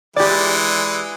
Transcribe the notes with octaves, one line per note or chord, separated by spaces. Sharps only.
E3 G#3 G4 D5